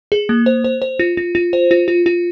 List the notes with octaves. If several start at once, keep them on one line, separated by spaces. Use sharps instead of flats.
G#4
A#3
C5
C5
C5
F4
F4
F4
C5
F4
F4
F4